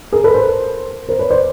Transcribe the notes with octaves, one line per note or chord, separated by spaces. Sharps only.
G#4 A#4
A4 B4
A#4 C5
A#4 C5
B4 C#5
C5 D5